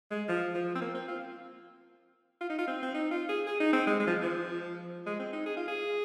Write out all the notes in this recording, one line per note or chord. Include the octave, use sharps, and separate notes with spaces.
G#3
F3
F3
C4
A#3
C4
F4
F4
D#4
F4
C4
C4
D#4
F4
G#4
G#4
D#4
C4
G#3
G#3
F3
F3
G#3
C4
D#4
G#4
F4
G#4